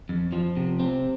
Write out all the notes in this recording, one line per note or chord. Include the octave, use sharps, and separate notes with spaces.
F2
F3
C3
C4